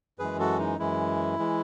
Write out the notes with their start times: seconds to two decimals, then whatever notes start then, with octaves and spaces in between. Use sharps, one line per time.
0.19 F#2 E3 G#3 G#4 B4
0.39 F#4 A4
0.59 D#4
0.79 F#2 E3 G#3 E4
1.39 E3 G#3